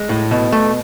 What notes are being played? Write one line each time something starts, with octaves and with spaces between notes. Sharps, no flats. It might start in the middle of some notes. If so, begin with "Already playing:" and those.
Already playing: G#3
A2
B2
A3